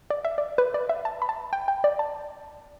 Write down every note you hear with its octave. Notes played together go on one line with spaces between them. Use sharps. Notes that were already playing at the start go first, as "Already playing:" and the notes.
D5
E5
D5
B4
D5
E5
A5
B5
A5
G5
G5
D5
A5